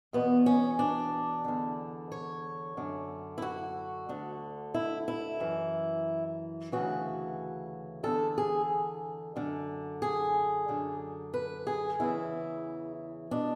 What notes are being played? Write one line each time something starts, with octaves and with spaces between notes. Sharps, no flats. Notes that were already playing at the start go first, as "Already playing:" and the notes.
E2 B2 B3
C#4
D4
E2 D3
C#5
F#2 D3
E4
F#4
D2 D3
E4
E4
F#2 E3
D2 C#3 E3 F#4
E2 D3 A4
G#4
F#2 D3
G#4
F#2 D3
B4
G#4
E2 C#3 E3 E4
B2 D4